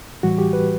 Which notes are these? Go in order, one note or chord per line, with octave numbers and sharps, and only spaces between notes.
A2 E3 G3 F#4
G4
B4